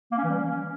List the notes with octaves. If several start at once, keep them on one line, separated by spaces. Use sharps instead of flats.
A#3
C#4
E3
G3
C#4